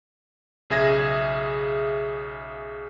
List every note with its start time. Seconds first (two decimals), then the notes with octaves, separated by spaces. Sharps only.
0.70 B1 C#3 G#4 E5 G#6 A#6